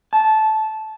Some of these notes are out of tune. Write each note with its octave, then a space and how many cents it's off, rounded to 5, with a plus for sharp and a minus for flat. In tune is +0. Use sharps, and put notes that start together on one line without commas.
A5 -15